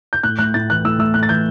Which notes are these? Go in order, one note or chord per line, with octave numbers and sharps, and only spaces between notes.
G6
A2 F#6
A3 F#6
A2 A6
E3 F#6
A2 E6
A3 E6
A2 F#6
A6
E3 G6